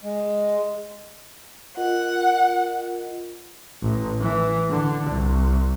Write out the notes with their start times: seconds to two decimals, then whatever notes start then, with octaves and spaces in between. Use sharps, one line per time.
0.03 G#3
1.77 F4 A#4 D#5 F#5
3.82 A1
4.21 E3
4.70 D3
5.11 C2